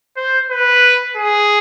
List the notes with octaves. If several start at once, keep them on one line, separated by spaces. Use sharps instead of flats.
C5
B4
G#4